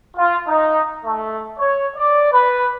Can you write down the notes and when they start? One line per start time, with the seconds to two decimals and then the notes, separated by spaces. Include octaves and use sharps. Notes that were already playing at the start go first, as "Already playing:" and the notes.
0.17 F4
0.47 D#4
1.05 A3
1.59 C#5
1.97 D5
2.31 B4